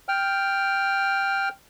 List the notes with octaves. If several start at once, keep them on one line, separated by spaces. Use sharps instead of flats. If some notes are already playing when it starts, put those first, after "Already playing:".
G5 F6